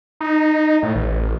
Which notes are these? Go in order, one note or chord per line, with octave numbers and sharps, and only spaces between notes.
D#4
A2
A1